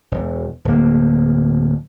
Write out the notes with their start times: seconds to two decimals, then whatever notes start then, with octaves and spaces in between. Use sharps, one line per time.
0.11 E1
0.65 D1 A#3